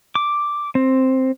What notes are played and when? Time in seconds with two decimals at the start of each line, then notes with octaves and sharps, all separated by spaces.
0.15 D6
0.75 C4